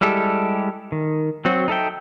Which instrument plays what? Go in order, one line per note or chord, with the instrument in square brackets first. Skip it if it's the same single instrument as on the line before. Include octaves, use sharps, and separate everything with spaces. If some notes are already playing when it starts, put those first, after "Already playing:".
[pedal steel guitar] G3 G#3 E4 G4 A4
D#3
F#3 C4 F#4
D#4 A4 E5 G5